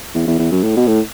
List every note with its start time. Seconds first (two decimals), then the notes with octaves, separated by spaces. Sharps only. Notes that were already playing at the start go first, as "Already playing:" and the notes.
0.14 E2
0.27 E2
0.39 E2
0.51 F#2
0.63 A2
0.76 B2
0.87 A2